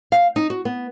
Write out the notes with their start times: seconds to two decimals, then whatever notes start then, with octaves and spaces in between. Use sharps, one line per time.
0.12 F5
0.36 D#4
0.50 F#4
0.65 B3